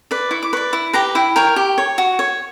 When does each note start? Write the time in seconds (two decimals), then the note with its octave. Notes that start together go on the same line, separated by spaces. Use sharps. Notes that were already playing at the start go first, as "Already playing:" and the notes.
0.11 B4 D5
0.31 E4 C#6
0.43 D6
0.53 B4 C#6
0.57 D5
0.73 E4
0.93 G4 B4 A#5
1.15 E4 G5
1.36 A#4 C#5 G5
1.56 G4
1.78 C#5
1.98 F#4
2.19 C#5